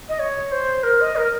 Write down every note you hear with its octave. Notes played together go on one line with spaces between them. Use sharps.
D#5
C#5
C5
A#4
D#5
A#4